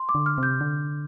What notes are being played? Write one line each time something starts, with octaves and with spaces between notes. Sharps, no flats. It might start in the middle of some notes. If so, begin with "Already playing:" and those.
Already playing: C6
D6
D3
F6
C3 G6
D3